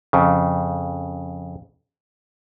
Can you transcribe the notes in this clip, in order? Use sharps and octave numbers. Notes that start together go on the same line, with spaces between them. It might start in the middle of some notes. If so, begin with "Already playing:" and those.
F2 C#3